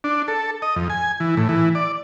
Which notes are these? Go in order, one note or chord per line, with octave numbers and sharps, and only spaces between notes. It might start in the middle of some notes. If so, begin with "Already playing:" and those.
D4
A4
D#5
F2
G#5
E3
A2
E3
D5